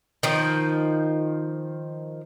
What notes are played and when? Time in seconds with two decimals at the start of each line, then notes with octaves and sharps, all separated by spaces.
0.23 D#3 F3